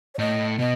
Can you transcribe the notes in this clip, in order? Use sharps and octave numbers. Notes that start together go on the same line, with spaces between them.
C#5
A2 D#5
B2 D#5